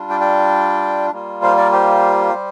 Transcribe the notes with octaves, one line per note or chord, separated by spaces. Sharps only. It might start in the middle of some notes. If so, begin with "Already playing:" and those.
Already playing: G3 D4 F4
D5 G5
D5 G5
G3 A#3 F4
C5 F5
A#4 D5
G4 C5
G3